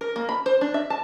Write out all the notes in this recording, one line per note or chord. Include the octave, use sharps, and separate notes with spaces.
A#4
A#3
B5
C5
D4
E5
A5